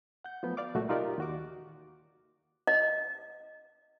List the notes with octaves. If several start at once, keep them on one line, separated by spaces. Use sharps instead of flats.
F#5 G6
F3 F#3 A3 B3
D5 F5 D6
C2 A#2 F#3 A3 F#4
D#4 F4 G4 A#4 D5
D#2 F#4 D6
D#5